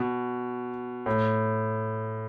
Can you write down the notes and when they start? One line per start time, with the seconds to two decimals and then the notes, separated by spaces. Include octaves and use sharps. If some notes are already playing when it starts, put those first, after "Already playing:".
Already playing: B2
1.06 A2